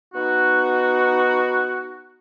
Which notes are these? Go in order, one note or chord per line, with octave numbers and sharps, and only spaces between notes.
B3 D#4 F#4